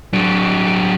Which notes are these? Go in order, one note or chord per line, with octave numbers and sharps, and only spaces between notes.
F#3 D4